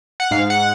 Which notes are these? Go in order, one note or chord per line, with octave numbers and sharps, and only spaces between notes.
F#5
G#2 F5
F#5